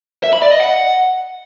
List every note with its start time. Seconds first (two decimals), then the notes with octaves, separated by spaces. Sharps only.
0.24 E5
0.33 B5
0.42 D5
0.51 D#5
0.60 F#5